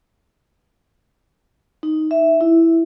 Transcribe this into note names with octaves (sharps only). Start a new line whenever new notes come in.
D#4
E5
E4